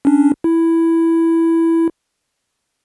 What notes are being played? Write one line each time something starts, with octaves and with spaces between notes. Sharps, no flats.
C#4 D4
E4